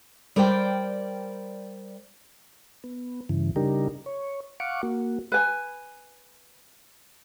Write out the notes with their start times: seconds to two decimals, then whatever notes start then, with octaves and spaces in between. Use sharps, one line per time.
0.36 G3 A#4 C5 D5 G5
2.84 B3
3.29 G2 C#3 E3
3.56 C#3 G3 D4 D#4 G4 A#4
4.06 C#5
4.60 F5 F#5 C#6 D6
4.83 A#3 F#4
5.32 B4 G#5